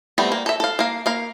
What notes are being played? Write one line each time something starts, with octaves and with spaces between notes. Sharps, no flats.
G3 A3 B3 C4
A#3
A4 E5
A4 F5
A#3 F5
A#3 F5